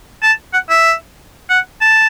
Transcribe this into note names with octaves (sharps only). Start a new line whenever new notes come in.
A5
F#5
E5
F#5
A5